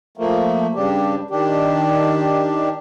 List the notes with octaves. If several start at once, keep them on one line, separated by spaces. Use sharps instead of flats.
F3 A3 A#3
G2 C#3 D4 G4
D#3 D4 G4